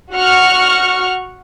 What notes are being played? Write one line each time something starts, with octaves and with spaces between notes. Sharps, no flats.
F#4 F#5 C#6 F6 C#7